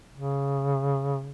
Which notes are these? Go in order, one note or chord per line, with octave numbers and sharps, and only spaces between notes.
C#3